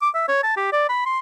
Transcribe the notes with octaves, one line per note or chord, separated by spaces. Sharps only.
D6
E5
C#5
A5
G4
D5
B5
C6